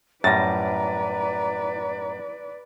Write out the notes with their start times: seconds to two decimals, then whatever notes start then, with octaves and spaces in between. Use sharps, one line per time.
0.24 F#2 A2 G3 B4 D5 A#5 A6 A#6